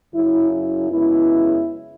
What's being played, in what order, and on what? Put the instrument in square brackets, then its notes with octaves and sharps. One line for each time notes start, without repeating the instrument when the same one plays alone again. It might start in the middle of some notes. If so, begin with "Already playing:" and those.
[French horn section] F#2 C#3 F#3 E4
E4
F#2 C#3 G#3 B3 E4